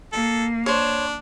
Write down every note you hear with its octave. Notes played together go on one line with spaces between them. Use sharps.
A#3 A4
D4 C5 C#5